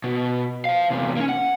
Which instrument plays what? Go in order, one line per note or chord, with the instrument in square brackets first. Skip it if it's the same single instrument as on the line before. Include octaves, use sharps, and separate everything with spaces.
[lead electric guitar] B2
C5 F5
E2 C3
A#3 C#4
F#5